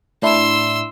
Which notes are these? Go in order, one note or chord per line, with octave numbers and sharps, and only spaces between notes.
A2 D4 E4 C6 E6